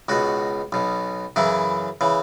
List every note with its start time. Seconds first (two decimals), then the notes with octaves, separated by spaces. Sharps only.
0.09 C#2 B2 F#4
0.72 B1 B2
1.36 F#2 C#3 E3 E4
2.01 C#3 E3